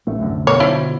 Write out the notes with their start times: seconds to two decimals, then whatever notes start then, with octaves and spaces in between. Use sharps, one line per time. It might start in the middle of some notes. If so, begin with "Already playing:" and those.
0.07 A1 A3
0.19 C2 F#2 D3
0.47 B2 C#5
0.60 D3 F3 E4